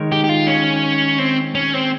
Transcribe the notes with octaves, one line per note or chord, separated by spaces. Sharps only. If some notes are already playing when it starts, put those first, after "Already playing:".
Already playing: D#3 G#3 D#4 A#4 C#5
G4
G4
F4
C#4
C4
C#4
C4